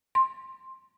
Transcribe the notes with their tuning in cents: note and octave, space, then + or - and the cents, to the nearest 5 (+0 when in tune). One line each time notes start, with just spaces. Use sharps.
C6 +10